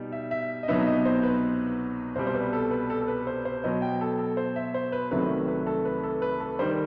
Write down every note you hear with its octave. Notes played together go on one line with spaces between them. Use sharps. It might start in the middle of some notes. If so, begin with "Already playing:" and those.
Already playing: B2 G3 D#4
E5
E5
D#5
C2 B2 F#3 B3 D#4 E5
E5
D#5
C5
B4
C2 B2 G3 C5
C5
B4
A4
B4
A4
A4
B4
C5
C5
B2 F#3 B3 D#5
G5
A4
A4
C5
E5
C5
B4
C2 C3 D#3 F#3 A3 B4
B4
A4
B4
A4
B4
A4
D#3 G3 C5